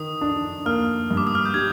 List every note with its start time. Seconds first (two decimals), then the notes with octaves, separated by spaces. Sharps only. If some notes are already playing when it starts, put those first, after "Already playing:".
Already playing: D#3 D#6
0.21 D4
0.66 A#3 F6
1.11 G2
1.17 D6
1.27 D#6
1.35 F6
1.46 G6
1.54 G3 G#6